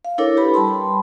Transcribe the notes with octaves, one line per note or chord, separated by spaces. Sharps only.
F5
D4 E4 A4 A#4 C#5 D6
G4 B4 B5
G3 A5 B5 C6